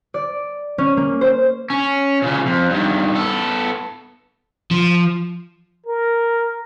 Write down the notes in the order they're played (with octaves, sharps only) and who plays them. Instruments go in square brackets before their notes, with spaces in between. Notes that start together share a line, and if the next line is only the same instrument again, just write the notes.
[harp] D5
C#4
A#3
C5
[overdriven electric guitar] C#4
A#2 C#3
F2
G2 D#3
B3 A4
F3
[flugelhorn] A#4